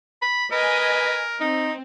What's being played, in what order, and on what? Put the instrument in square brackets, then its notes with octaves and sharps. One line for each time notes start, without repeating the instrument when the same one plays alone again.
[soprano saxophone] B5
[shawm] A#4 [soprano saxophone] B4 [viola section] D#5 G#5
[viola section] C4 [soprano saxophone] D#4